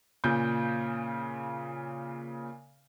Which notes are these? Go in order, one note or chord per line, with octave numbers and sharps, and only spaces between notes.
A#2 C#3 G6